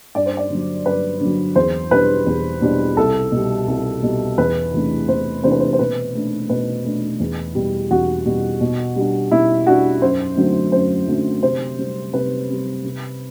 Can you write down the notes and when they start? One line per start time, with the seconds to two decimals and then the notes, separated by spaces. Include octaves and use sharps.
0.15 G2 D5
0.26 C5
0.37 D5
0.50 D3 F#3
0.86 G2 B4
1.21 D3 F#3
1.56 E2 C5
1.91 B2 G3 D4 B4
2.27 E2
2.62 B2 G3 D4
2.97 C2 A4
3.32 B2 G3
3.68 C2
4.03 B2 G3
4.38 E2 B4
4.73 C3 E3 A3 D4
5.08 E2 C5
5.44 C3 E3 A3 D4 C5
5.52 B4
5.60 C5
5.73 C5
5.79 B2 B4
6.15 A3 D4
6.49 B2 B4
6.85 A3 D4
7.20 E2
7.55 B2 G3
7.91 E2 F#4
8.26 B2 G3
8.61 B2
8.96 G3 D4
9.31 B2 E4
9.67 G3 D4 F#4
10.02 F#2 C5
10.37 D3 F#3 A3 C4
10.72 F#2 C5
11.07 D3 F#3 A3 C4
11.43 C3 C5
11.78 G3 C4
12.13 C3 B4
12.48 G3 C4
12.84 C3